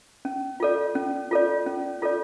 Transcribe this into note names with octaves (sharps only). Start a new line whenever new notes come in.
C#4
F4 A4 D5
C#4
F4 A4 D5
C#4
F4 A4 D5